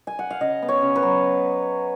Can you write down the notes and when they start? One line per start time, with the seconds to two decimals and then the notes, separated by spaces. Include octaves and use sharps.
0.07 G#5
0.19 F#5
0.30 F5
0.41 C#3 D#5
0.62 B3
0.69 C#5
0.82 C#3
0.95 B4
1.03 F#3